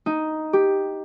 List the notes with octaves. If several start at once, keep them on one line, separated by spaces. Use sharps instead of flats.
D#4
G4